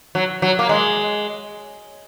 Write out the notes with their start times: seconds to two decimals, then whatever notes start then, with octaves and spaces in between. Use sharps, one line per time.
0.15 F#3
0.42 F#3
0.59 A#3
0.69 G#3